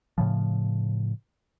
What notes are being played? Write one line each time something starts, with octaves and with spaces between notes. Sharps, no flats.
A2 C#3 F3